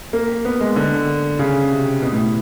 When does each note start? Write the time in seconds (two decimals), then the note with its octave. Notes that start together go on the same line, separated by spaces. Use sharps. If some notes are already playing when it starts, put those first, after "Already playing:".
0.13 A#3
0.45 B3
0.61 G#3
0.76 D3
1.39 C#3
1.71 C3
2.02 B2
2.12 A2